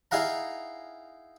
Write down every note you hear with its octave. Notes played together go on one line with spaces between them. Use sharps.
D#4 E4 G#4 F5 F#5 A#5